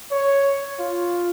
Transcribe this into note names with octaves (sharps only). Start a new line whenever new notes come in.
C#5
F4